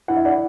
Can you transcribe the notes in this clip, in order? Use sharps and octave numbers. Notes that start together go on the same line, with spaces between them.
E4 F#5
E5
D5 F#5